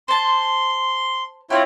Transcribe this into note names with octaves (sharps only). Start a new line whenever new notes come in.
C5 A5 C6
C4 C#4 E4 F4 G4 C#5